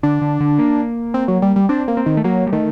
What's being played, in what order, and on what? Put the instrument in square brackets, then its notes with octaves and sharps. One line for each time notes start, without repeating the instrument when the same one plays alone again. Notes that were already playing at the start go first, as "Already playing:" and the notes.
[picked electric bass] D3 [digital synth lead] D4
[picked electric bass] D3
D3
A#3
[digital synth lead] C4
F#3
G3
G3
[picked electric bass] C4 [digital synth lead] D4
[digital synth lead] A#3
[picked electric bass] C4
[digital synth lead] D#3
[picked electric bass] A3
[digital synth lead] F#3 [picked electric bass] A#3
[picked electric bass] G3
[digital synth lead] D#3 [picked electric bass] A3